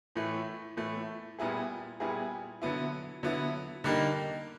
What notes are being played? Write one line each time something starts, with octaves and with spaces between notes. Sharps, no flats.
A2 E3 A3
A2 E3 A3
A#2 G3 B3 E4 G#4
A#2 G3 B3 E4 G#4
D3 F#3 B3 E4
D3 F#3 B3 E4
D3 G3 A#3 D#4